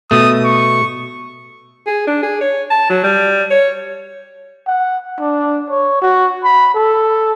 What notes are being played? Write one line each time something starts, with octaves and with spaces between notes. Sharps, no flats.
B2 A3 D#6
C#6
G#4
D4
G#4
C#5
A5
F#3
G3
C#5
F#5
D4
C#5
F#4
B5
A4